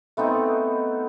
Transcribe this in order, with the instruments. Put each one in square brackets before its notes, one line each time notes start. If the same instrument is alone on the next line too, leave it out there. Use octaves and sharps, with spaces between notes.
[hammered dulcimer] A3 B3 C4 D#4